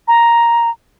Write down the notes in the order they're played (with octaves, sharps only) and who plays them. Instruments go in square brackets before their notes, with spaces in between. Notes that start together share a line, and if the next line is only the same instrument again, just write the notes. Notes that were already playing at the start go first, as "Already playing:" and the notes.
[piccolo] A#5